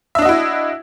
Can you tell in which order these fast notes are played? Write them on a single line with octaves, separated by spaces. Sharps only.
E5 D4 D#5 F#4 E4